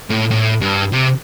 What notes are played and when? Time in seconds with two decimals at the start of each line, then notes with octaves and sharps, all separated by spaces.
0.10 A2
0.31 A2
0.61 G2
0.93 C3